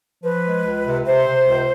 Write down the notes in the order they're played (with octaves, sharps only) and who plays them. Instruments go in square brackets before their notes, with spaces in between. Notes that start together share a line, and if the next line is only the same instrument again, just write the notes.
[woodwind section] F3 B4
G#3
C#2
C3
C3 C5
C3
C#2